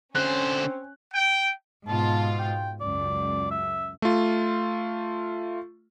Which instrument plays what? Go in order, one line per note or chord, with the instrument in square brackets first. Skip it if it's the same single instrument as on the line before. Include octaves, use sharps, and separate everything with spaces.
[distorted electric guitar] D3 C5 [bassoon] C4 [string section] C#4 [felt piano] F#6
[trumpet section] G5
[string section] G#2 B2 F4 [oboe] A5
[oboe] G5
[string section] C#2 F#2 [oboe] D5
[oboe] E5
[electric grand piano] A3 F4